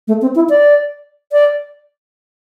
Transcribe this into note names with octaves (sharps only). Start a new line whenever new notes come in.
A3
C4
E4
D5
D5